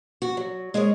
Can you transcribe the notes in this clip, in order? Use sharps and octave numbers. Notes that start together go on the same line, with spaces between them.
F#4
F#3
G#3 G#4 A#4 C#5